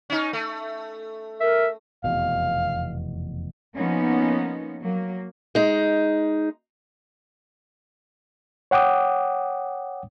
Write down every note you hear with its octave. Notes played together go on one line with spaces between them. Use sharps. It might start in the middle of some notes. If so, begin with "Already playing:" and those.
C#4 D#4
A3
A#4 E5
F1 E2 B2 F5
F3 A#3 B3 C#4 D#4
F#3 A#3
G#3 D#4
C#5 F#5 G5 D6 D#6